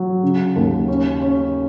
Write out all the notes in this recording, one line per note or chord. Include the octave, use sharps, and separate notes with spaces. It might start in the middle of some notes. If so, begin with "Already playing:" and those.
Already playing: F#3
C#3
D#2
C#4
C#4